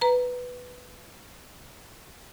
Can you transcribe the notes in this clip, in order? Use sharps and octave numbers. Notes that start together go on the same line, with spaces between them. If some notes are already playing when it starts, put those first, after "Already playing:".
B4 A#5